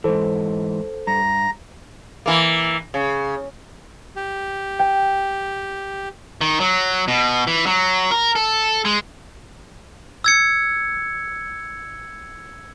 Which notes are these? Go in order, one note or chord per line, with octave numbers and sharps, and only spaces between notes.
G#2 E3 A4 C5
G2 A#5
E3 A#3
C#3
G4
G5
D#3
F#3
B2
E3
F#3
A#4
A4
G#3
E6 G#6 C#7